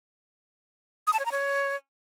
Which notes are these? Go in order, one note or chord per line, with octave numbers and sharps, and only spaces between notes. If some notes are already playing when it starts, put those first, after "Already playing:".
D#6
A5
C#5
A#5
C#5